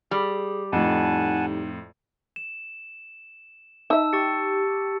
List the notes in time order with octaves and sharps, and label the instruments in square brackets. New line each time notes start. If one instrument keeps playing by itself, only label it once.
[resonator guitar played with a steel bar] G3 [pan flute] G#4
[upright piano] F2 A2 [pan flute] D#4 [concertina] F#5 G#5 A5
[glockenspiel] E7
[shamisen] D#4 E5 [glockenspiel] A5 E6
[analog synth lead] G4 [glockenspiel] C#6 A6 C#7